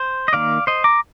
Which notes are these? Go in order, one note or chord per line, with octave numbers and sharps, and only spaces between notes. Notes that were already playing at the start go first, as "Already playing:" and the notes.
Already playing: C5
D#5
D#3 A#3 D5 F5
C5 D#5
A#5 D6